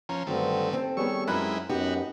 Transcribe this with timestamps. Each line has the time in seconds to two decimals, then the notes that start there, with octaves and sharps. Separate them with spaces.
0.09 F3 C#4 A#5
0.27 G2 D3 D#3 F#3 A3 C4
0.73 C4 A4
0.97 D#3 G3 B3 G#4 C#5 C#6 E6
1.28 F#2 G#3 D#4 E4 A#4 B5 F#6
1.69 F#2 B3 D#4 F#4 G4